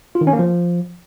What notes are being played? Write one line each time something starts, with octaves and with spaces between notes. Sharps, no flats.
F4
D#3
C#4
A#3
F3